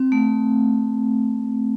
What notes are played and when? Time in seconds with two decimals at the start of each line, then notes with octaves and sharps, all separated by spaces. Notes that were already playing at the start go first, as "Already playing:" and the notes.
Already playing: C4
0.12 A3